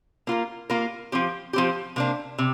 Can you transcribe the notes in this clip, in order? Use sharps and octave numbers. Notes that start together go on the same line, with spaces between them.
A#3 F4 A#4
A#3 F4 A#4
F3 C4 G4
F3 C4 G4
C3 A#3 D4
C3